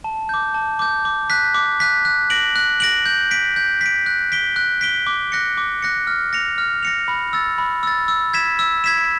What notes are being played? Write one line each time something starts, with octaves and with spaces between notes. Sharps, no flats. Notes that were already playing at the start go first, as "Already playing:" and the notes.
A5
D6 G6
A5
D6 G6
D6
F#6 B6
D6
F#6 B6
F#6
A#6 D7 F#7
F#6
A#6 D7 F#7
G6
B6 D7
G6
B6 D7
F#6
B6 D7 G7
F#6
B6 D7 G7
D6
F#6 A#6 C#7
D6
F#6 A#6 C#7
F6
A#6 C#7 F7
F6
A#6 C#7 F7
B5
E6 A6
B5
E6 A6
E6
G#6 B6 E7
E6
G#6 B6 E7